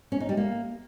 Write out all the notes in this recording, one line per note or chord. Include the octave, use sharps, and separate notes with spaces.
C#4
D#4
G3
A#3